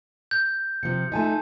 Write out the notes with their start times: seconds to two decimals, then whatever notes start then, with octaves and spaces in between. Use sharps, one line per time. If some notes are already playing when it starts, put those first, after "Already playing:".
0.31 G6
0.83 C3 F3 C#7
1.12 A3 D#4 F4 G#5 A5